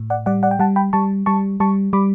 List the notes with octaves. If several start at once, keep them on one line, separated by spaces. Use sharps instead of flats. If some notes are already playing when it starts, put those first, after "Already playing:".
Already playing: A2
D5 F#5
G3 D5 F#5
D5 F#5
G5
G3 F#5 A5
G5 B5
G3 A5 C#6
G3 A5 C#6
G3 A5 C#6
G3 B5 D6